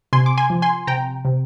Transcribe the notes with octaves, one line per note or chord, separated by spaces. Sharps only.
C3 G#5 C6
D6
G#5 C6
F3
G#5 C6
C3 G5 A#5
C3